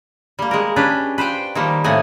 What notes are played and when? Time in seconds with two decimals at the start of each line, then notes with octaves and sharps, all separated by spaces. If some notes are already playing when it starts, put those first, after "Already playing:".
0.39 G3 A#3
0.51 G#3 A#4
0.76 C#4 D4 G4 B4
1.18 B4 C5 F5 G5
1.55 D#3 F3 G3 A#3
1.84 A2 C3 A#3 D#5 F#5 G#5